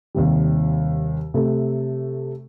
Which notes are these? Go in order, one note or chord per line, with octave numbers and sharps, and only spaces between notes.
D#2 C3 G3
C3 A3